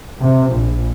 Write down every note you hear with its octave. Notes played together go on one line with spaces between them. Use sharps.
C3
A#1